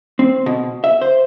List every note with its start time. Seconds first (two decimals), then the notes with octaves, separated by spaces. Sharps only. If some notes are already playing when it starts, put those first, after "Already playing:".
0.19 C4
0.46 B2
0.84 E5
1.01 C5